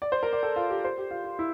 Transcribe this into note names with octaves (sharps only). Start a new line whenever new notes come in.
D5
C5
A#4
D5
A4
F4
G4
C5
G4
F4
F4
E4